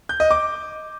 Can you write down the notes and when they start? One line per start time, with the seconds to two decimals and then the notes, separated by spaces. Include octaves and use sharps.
0.09 G6
0.20 D#5
0.31 D6